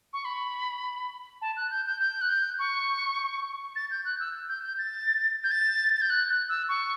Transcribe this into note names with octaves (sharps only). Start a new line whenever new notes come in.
C#6
B5
A5
F#6
G6
G6
G6
F#6
G6
C#6
A6
G6
F#6
E6
G6
G6
A6
G6
A6
A6
G6
F#6
F#6
E6
C#6